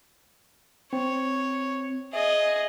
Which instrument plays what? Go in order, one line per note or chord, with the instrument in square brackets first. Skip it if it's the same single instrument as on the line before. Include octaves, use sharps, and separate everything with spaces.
[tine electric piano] C4 [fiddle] C#5
[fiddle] G#4 D#5 [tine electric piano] E5